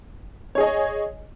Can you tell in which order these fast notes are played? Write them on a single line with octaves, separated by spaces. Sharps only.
C#5 G#4 D#5 G#5